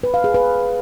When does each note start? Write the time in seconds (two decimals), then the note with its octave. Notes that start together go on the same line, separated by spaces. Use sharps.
0.03 B4
0.14 F5
0.24 G#4
0.34 B4